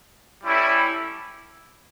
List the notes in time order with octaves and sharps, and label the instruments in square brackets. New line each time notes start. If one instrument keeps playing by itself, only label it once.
[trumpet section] G3 C#4 E4 A4